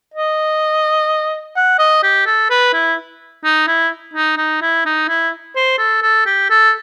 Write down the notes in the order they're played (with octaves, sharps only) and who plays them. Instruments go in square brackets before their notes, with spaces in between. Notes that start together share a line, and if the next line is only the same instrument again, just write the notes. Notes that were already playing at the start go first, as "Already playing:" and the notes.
[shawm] D#5
F#5
D#5
G4
A4
B4
E4
D#4
E4
D#4
D#4
E4
D#4
E4
C5
A4
A4
G4
A4